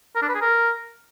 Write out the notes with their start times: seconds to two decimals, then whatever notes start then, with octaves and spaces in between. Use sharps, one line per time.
0.16 A#4
0.22 D4
0.28 B4
0.35 G#4
0.41 A#4